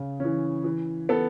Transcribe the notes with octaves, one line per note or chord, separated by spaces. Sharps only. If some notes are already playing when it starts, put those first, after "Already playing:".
Already playing: C#3
E3 C#4
E3
B3 A4